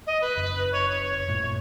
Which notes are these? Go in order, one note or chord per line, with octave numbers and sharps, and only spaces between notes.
D#5
B4
F#1
C#5
C#5
G2 A#2 A3